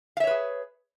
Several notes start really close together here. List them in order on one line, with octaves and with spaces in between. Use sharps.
F5 E5 C#5 B4 G#4